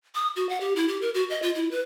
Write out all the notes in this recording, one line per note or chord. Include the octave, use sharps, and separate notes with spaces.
D#6
F#4
F#5
G4
E4
G4
A#4
F#4
D#5
F4
E4
B4